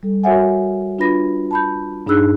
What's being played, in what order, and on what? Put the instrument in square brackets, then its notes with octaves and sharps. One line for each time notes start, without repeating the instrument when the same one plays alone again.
[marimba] G3 A4
F#4 A#4 C#5 E5 F#5 G#5
D4 F4 B4 B5 A#6
A5 B5 G6
G2 D4 D#4 G#4 E6 F#6